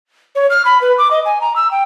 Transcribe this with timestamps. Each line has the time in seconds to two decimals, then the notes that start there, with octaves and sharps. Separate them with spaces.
0.35 C#5
0.50 F6
0.65 B5
0.81 B4
0.98 D6
1.11 D#5
1.25 G#5
1.41 A#5
1.56 E6
1.71 G5